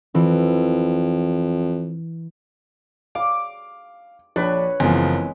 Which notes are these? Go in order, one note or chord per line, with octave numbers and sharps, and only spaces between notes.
F2 E3
F5 D6
A#1 D4 B4 C#5
F#1 E3 F3 G#3 B3 C4